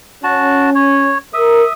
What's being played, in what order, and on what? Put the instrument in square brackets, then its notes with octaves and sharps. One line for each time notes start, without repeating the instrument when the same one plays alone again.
[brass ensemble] C#4 [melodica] F#4 A5
[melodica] C#5
[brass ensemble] A#4 [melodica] E5 D#6